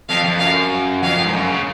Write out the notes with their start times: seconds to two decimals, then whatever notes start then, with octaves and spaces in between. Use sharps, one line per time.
0.09 F2 F5
0.24 F2
0.39 F#2 F5
1.03 F2 F5
1.18 F2
1.26 G#2
1.33 F#2
1.49 C#3